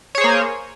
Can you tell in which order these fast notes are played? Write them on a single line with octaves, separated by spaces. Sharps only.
C#5 G#4 C5 A#3